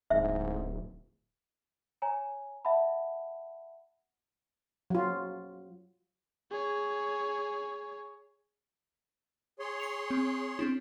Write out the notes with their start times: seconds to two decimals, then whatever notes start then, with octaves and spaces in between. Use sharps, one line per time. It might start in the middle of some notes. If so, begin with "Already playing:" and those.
0.10 D1 G#2 E5
2.02 C#5 G#5 A#5
2.65 E5 F#5 A5 B5
4.90 F#3 F4
6.51 G#4 C#5
9.59 G#4 C#5 C6
9.80 C#6 C#7 F7
10.10 C4
10.59 C4 D4 E4